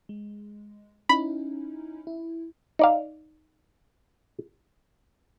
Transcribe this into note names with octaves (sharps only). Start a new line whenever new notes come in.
G#3
C#4 D#4 E4 B5
E4
D#4 D5 F5